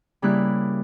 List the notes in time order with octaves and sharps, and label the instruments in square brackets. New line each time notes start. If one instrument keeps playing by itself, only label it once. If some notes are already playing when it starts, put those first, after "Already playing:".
[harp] C#3 G3 A#3 E4 B5 F#6